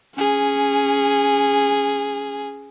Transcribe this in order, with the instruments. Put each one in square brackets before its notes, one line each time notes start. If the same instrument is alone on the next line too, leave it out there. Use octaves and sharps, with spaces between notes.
[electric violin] C#4 G#4